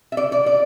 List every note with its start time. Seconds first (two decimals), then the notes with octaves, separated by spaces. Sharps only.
0.12 E5
0.17 D5
0.32 D5
0.46 D5